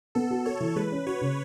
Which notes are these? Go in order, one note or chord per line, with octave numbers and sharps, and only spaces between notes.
B3 A4
F#4
A4 C#5
E3
G#3 B4
C#4
F#4 C#5
C#3